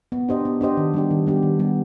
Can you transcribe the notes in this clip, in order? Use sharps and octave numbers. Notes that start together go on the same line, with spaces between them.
B3
D4 G4 C5 D#5
B3
D4 G4 C5 D#5
D#3
G3 B3 D4 G4
D#3
G3 B3 D4 G4
D#3
G3 B3